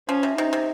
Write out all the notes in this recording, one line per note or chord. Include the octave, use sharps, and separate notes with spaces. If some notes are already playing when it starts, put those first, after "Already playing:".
F3 C#4
C3
C3 D#4
C3